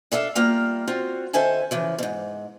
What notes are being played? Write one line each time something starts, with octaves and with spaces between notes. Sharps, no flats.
D4 A4 E5 F5
G3 A#3 F4 A#5
C4 F4 F#4
D#3 A4 C5 E5 G#5 A5
C#3 E3 F3
G#2 B2